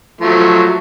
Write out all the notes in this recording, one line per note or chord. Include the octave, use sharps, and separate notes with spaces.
F3 F#3 A3